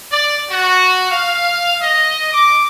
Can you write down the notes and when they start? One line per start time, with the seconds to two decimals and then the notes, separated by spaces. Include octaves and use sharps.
0.11 D5
0.49 F#4
1.10 F5
1.81 D#5
2.32 D6